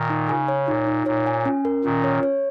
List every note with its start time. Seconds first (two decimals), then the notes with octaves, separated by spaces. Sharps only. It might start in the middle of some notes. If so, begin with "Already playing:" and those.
Already playing: A#2 D#3
0.10 D#4
0.29 C#3 G#5
0.48 C#5
0.68 A#2 D#4
0.87 D#4
1.06 A#2 C#5
1.26 G#5
1.45 C#4
1.65 A#4
1.84 A#2 D#3 C#4
2.04 C#5
2.23 C#5